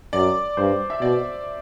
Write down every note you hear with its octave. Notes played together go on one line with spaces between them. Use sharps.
F#2 D5
G2 C5
E5
B2 D5